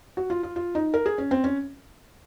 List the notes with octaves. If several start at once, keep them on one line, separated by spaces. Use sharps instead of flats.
F#4
F4
F4
F4
D#4
A#4
G#4
C#4
C4
C#4